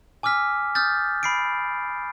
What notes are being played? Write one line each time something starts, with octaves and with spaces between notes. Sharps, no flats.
G#5 D6 E6 F6 B6
D#6 F6 G6 A6
B5 C7 D7